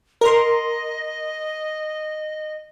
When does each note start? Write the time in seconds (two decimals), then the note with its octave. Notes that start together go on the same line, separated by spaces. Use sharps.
0.21 A#4 D#5 C6